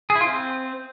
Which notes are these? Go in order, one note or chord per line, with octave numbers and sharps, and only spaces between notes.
G#4
E4
F4
C4